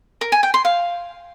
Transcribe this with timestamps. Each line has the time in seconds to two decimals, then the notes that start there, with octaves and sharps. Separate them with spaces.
0.21 A#4
0.32 G#5
0.43 G5
0.54 C6
0.65 F5